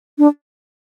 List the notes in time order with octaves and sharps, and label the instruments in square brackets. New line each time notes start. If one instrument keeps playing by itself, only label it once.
[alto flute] D4